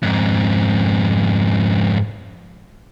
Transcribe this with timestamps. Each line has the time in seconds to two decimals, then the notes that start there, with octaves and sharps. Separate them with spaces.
0.03 F2 G#2